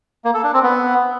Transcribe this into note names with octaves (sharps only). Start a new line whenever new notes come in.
A#3
A4
D4
C4
B3